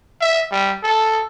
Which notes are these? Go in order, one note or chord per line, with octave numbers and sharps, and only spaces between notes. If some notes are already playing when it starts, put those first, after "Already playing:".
E5
G3
A4